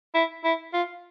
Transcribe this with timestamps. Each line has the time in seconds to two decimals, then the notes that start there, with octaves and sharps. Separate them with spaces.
0.15 E4
0.44 E4
0.73 F4